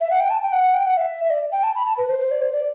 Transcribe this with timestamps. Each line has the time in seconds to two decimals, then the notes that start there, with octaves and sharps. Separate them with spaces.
0.01 E5
0.10 F#5
0.20 G5
0.30 A5
0.42 G5
0.52 F#5
0.74 G5
0.86 F#5
0.97 E5
1.24 E5
1.30 D5
1.52 G5
1.63 A5
1.75 B5
1.86 A5
1.97 B4
2.08 C5
2.20 C5
2.31 D5
2.41 C5
2.53 D5